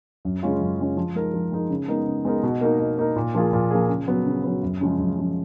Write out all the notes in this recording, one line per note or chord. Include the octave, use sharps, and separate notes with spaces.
F#2
C#3 G#3 C#4 F4
F#2
C#3 G#3 C#4 F4
F3
G#3 D#4 A#4
F3
G#3 D#4 A#4
C#3
G#3 B3 D#4 A#4
C#3
G#3 B3 D#4 A#4
B2
A#3 D#4 A#4
B2
A#3 D#4 A#4
A#2
F3 A#3 F4 G#4
A#2
F3 A#3 F4 G#4
C#3
F#3 B3
C#3
F#3 B3
F#2
C#3 F3 G#3
F#2
C#3 F3 G#3